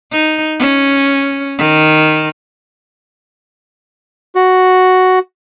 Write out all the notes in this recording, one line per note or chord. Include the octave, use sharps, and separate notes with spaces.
D#4
C#4
D#3
F#4